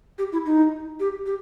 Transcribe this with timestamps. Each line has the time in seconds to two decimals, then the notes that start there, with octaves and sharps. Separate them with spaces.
0.19 G4
0.33 E4
0.46 D#4
1.00 G4
1.26 G4